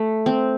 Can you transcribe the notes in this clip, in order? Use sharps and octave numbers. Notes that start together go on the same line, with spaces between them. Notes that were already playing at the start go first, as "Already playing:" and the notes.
Already playing: A3
C4